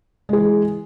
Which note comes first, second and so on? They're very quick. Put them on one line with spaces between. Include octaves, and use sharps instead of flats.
G#3 G#4 E3